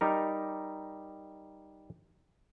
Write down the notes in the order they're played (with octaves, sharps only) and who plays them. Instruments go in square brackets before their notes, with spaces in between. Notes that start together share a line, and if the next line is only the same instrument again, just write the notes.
[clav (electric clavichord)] G3 D#4 A#4